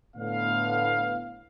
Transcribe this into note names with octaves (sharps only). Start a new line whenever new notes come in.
A2 D3 B3 F5